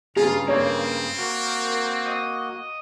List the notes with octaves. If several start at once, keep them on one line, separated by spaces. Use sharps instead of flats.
G2 C#3 F4 G#4 A#5
A#3 C4 C#5
A#3 F#4 A#4
D#5